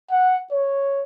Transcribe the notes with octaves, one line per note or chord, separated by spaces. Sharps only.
F#5
C#5